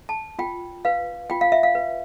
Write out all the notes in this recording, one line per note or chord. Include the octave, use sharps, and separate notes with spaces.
A5
F4 G5
B4 F5
F4 G5
F5
E5
F5
B4